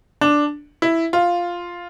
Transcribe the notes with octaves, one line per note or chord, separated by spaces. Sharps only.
D4
E4
F4